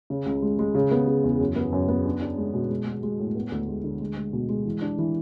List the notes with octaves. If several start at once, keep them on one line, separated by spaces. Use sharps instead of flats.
C#3
C#2
G#3
G#3
C#3
B3
C#3
E2
F#2
B3
F#2
B3
D4
D4
G#3
B2
G#3
G#3
G#3
A2
B3
D2
G#3
D3
G#3
G#3
B2
G#3
E3
D4
E3